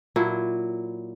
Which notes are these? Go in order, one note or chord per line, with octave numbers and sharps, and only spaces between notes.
A#2 F#3 E4